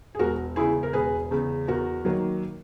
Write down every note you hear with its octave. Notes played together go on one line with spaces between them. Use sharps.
G#4
E1 F#4 A#4
E2 C#3 E4 G#4
A#4
E1 G#4 B4
E2 C#3
E2 F#4 A#4
D#3 F#3 A#3